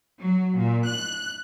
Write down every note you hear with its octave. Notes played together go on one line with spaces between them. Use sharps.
F#3
A#2
F#6